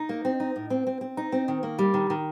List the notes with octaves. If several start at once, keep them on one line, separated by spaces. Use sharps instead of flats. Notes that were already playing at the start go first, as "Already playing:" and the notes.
Already playing: D#4
A#3
C4
D#4
A2
C4
C4
C4
D#4
C4
D#3
A#3
G3
D#3
D#3